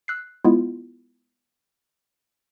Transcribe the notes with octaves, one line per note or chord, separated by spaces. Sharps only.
E6 F#6 C7
G#3 B3 E4 F4